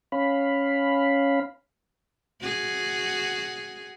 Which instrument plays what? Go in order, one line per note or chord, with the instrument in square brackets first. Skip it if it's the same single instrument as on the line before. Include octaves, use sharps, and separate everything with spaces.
[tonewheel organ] C#4 F5 B5
[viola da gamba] F#4 G#4